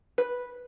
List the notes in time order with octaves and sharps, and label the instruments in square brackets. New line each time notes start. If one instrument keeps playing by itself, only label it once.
[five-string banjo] B4